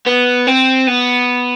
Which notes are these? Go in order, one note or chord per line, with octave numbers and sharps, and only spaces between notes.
B3
C4
B3